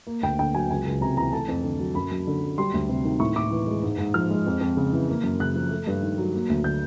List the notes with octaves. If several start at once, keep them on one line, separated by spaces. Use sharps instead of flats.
A#3
D2 G5
D3 G5
F#3 G#5
C#2 G#5
C#2
C3 A#5
E3 A#5
A3 A5
F2
D3
F#3
F#2 B5
F#2
D3
F#3
G3 C6
D2
C3
D#3
A2 C#6
A2 D6
E3
G#3
G#2
G#2
F3 F6
G#3
F2
F2
C#3
E3
A#3
F#2
C#3 F#6
F3
A3
G2
D#3
F#3
A#3
D2
D3 G6